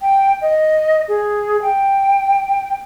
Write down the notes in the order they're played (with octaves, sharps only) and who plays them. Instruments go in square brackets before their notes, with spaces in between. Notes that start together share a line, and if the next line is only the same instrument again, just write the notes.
[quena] G5
D#5
G#4
G5